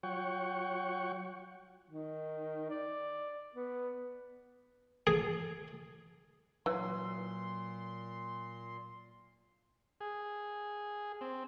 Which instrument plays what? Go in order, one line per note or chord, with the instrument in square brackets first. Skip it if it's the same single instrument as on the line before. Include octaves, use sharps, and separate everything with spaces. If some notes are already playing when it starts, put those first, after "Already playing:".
[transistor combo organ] F#3 F4 C#5 F#5 G5 C#6
[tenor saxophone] D#3
D5
B3
[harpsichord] G#4
[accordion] A#2 C6 [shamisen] E3 [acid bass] F#3
[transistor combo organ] G#4
C4